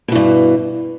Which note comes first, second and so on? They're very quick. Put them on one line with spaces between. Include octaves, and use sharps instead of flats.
B2 E3 G2